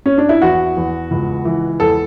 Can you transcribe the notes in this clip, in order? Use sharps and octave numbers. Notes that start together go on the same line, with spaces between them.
C#4
D4
E4
E2 F#4
E2
C#2
E3
E2 A4